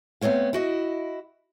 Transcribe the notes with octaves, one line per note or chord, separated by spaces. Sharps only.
A3 B3 C4 C#5 F5
E4 F#4 D#5